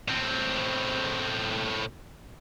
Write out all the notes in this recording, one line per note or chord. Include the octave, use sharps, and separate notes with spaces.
A2 C4